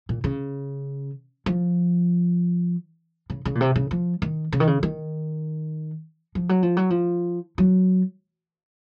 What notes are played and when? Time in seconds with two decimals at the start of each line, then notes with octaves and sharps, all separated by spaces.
0.09 A#2
0.24 C#3
1.46 F3
3.30 C#3
3.45 C#3
3.55 A#2
3.61 C3
3.76 C#3
3.91 F3
4.22 D#3
4.52 C#3
4.60 D#3
4.67 C#3
4.83 D#3
6.35 F3
6.49 F#3
6.63 F3
6.77 F#3
6.90 F3
7.58 F#3